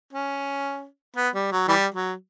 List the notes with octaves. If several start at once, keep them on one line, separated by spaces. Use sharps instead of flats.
C#4
B3
G3
F#3
E3 G3
F#3